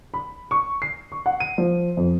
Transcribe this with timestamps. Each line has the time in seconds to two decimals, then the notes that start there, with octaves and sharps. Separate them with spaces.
0.14 B5
0.51 C#6
0.82 C7
1.12 C#6
1.26 F#5
1.40 D#7
1.58 F3
1.97 F2